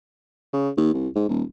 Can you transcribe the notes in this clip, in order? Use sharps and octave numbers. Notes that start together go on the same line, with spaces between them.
C#3
D#2
C2
G#2
D#1